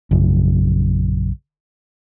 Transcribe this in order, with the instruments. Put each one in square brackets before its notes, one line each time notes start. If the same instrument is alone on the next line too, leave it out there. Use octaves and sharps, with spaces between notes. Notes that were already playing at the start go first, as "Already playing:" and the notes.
[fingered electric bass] A#1 F#2 C#3